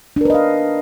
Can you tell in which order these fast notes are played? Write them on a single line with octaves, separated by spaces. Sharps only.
D4 A#4 B4 D#5 F5